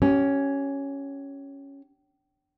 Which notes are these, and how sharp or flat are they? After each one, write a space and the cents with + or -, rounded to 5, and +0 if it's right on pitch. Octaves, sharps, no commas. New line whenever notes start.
C#4 +0 G4 -30